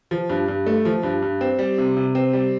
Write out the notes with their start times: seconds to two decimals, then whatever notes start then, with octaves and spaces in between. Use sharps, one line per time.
0.11 F3
0.30 G2
0.48 G2
0.66 A3
0.85 F3
1.03 G2
1.22 G2
1.41 C4
1.59 G3
1.78 C3
1.97 C3
2.15 C4
2.33 G3